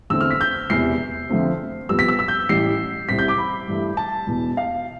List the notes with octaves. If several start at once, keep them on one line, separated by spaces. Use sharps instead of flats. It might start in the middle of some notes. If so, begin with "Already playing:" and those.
E2 D3 A3 C4 E6
F6
B6
G6
E1 E2 C3 C7
F2 D3 F3 A3 C4
F2 C3 G3 B3 E6
B6
E6
E6
G6
A1 A2 G3 C7
C2 C3 G3 C4 B6
G6
D6
B5
G2 E3 A3
A5
E1 E2 B2
F5